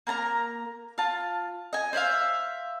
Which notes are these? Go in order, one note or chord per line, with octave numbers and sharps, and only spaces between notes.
A#3 A#4 A5 A#5
F4 A5
D#5 G#5
C5 D5 E5 F5